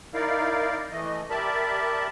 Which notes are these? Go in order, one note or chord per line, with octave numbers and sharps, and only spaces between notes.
D#4 E4 A#4 D5 F5
E3 A3 D#5
G4 A#4 D5 E5 A5 B5